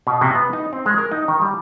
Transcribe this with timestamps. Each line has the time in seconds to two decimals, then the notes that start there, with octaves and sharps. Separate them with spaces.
0.07 B2
0.21 C3
0.35 B3
0.53 D#4
0.73 C4
0.86 G#3
0.98 A#4
1.12 D#4
1.28 D#3
1.42 G3